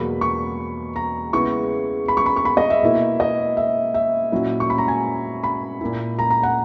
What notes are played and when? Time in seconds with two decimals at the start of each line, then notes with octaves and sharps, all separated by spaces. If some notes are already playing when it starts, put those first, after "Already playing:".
Already playing: E2 B2 F#3 A#3 B5
0.21 C#6
0.96 A#5
1.33 C#3 G#3 B3 E4 C#6
2.08 B5
2.17 C#6
2.26 B5
2.36 C#6
2.45 B5
2.57 D#5
2.70 E5
2.83 B2 A#3 E4
3.20 D#5
3.57 E5
3.94 E5
4.32 A#2 F#3 C#4 E4
4.60 C#6
4.70 B5
4.78 A#5
4.88 G#5
5.44 B5
5.81 A#2 A#3 E4
6.19 A#5
6.30 A#5
6.43 F#5